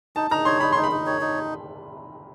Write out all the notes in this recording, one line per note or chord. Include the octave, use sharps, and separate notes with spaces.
D#4 A5
D#4 A#5
C#5 C6
D#4 B5
D#4 C6
B5
D#4
C#5
D#4